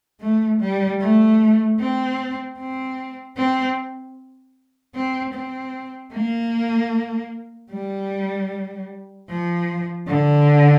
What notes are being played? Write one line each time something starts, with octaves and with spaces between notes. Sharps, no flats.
A3
G3
A3
C4
C4
C4
C4
C4
A#3
G3
F3
D3